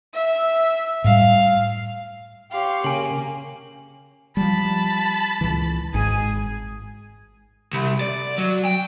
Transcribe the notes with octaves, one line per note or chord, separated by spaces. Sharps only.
E5
A2 G3 F5
G4 C#5 F5 C6
C#3 A#3 G#5 F#7
F3 G3 A5 B5
C#2 A#2 E3
G#1 G#2 G#4 G#5
C2
D5
F#3
G5